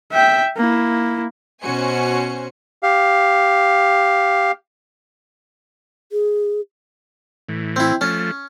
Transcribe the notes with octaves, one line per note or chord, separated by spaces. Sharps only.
E5 G5
A#3 E4
B2 C#4 F#4 C5 G#5 C#7
G4 F5
G#4
A2 E3
C4 E4
F3 A3 C#4